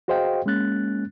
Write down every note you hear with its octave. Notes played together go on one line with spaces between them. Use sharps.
F#4 G#4 C5 D#5 F5 G5
G#3 A#3 C#4 F#6 A6